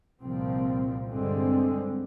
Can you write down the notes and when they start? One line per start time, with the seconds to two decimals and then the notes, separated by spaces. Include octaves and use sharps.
0.22 C2 A#2 F3 C4
1.07 G2 D3 G#3 C4